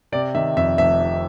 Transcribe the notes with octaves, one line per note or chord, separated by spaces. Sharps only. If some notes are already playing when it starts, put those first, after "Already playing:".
C3 D5
D#3 E5
F2 E5
F1 E5
C3